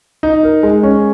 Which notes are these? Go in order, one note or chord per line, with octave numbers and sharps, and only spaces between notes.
D#4
A#4
G#3
C#4